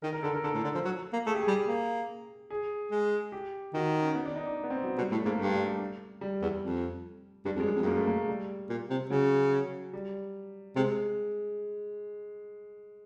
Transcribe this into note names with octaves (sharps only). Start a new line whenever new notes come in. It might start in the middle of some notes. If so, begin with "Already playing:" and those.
D#3 A#4
A#4
D3 A4
A#4
D3 A4
A2
D3
F3
F#3
A#3
A3 G#4
G4
G#4
G3
A#3
G#4
G#3
G4
D#3 F#4
C#4
B3
D4
D#4
D4
B3
C4
F#3
B2 G3
A2 A3
G#2 A#3
G2 A3
G3
G3
G3
E2
F2
G2 G3
F2
G#3
F#2
F2
G2
F#2 A#3
A3
A#3
A3
G3
A#2
C3
C#3 F#3
G3
C3 G#3